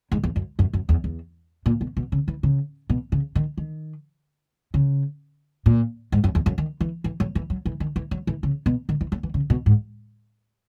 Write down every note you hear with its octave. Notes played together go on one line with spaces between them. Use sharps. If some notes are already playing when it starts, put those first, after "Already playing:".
G#2
E2
F#2
F#2
F#2
E2
E2
A#2
B2
B2
C#3
E3
C#3
B2
C#3
D#3
D#3
C#3
A#2
G#2
F#2
E2
F#2
D#3
E3
E3
F#3
E3
F#3
E3
D#3
E3
F#3
E3
C#3
B2
D#3
E3
F#3
E3
C#3
B2
G#2